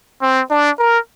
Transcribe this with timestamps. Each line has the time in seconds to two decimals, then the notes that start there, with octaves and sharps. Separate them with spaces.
0.22 C4
0.51 D4
0.79 A#4